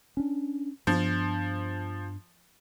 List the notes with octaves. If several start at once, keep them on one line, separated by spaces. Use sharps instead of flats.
C#4 D4
G2 F3 B3 D4